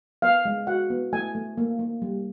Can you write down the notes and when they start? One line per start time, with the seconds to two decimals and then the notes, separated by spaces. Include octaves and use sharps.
0.22 B3 F5
0.45 G#3
0.67 F#4 F#5
0.90 B3
1.13 A3 G#5
1.35 A3
1.58 A#3
1.79 A#3
2.02 G3